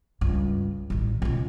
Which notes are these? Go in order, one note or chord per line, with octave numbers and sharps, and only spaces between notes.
C#2 G2
A1 D#3
C#2 B2